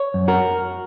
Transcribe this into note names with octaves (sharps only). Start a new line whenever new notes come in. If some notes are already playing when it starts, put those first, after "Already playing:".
Already playing: C#5
F#2
F#4 A#4